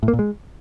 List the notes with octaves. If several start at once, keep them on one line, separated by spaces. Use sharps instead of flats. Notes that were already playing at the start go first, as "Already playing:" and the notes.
A2
A#3
A#2
G#3